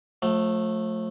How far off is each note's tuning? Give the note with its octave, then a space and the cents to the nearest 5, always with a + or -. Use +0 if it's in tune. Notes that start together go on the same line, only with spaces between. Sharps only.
F3 +40 A3 +0